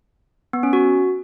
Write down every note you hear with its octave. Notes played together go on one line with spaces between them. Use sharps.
B3
C#4
F#4